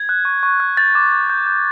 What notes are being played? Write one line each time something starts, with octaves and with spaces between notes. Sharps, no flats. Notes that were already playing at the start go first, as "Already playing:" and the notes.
Already playing: G#6
F#6
C#6
C#6
F#6
G6 A6
D6
D6
G6
G6